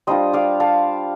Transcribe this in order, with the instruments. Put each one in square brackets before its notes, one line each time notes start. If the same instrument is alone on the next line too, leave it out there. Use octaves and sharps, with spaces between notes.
[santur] G3 D4 F4 C5 D#5
D5 F5
F5 A5